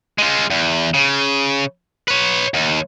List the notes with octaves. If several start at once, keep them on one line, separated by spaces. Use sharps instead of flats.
G#3 F4
E2
C#3
B4 C#5
D#2